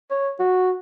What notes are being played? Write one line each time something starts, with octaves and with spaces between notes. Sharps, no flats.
C#5
F#4